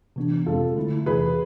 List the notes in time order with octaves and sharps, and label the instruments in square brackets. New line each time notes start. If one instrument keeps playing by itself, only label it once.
[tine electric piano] C3 E3 B3 D4
[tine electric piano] F2 C3 F3 G#3 C4 [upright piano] F4 A4
[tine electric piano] D3 A3 E4
[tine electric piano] E2 C3 E3 [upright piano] G#4 B4